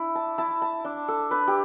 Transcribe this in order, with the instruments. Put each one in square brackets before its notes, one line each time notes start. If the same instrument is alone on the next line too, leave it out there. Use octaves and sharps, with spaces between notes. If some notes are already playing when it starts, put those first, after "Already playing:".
Already playing: [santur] D4 E4
A5
E4 A5
A5
D4
A4
D4 B4
G4